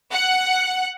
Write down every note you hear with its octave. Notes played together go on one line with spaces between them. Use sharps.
F#5